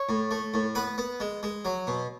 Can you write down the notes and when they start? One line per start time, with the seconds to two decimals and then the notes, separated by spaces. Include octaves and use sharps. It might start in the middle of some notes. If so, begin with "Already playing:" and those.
Already playing: C#5
0.09 A2
0.31 A3
0.54 A2
0.75 B3 B4
0.98 B3
1.20 G#3
1.43 G#3
1.65 F#3
1.87 B2